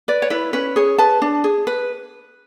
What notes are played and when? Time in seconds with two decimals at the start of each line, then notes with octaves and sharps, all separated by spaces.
0.08 B4 D5
0.22 C#5
0.30 E4 B4
0.53 C#4 B4
0.76 G#4 C#5
0.98 B4 A5
1.22 D4
1.44 G#4
1.67 B4